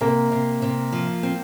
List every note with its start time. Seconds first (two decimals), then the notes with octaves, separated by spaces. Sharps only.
0.01 C3 A#3
0.32 C3
0.62 C3
0.92 F3
1.23 C4